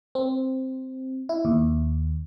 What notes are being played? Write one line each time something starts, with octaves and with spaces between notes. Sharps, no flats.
C4
E4
D#2